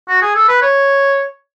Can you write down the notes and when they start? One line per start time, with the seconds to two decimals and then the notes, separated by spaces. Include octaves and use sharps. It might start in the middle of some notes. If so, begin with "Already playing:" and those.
0.08 F#4
0.22 G#4
0.35 A4
0.48 B4
0.62 C#5